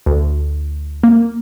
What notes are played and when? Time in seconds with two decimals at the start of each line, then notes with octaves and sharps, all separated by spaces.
0.06 D2
1.03 A#3